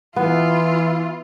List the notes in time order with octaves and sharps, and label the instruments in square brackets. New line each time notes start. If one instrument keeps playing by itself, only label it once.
[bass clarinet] E3 [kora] B3 [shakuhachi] E4 [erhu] F4